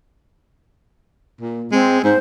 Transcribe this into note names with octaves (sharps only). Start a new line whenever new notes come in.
A#2
G#3 C4
G#2 C5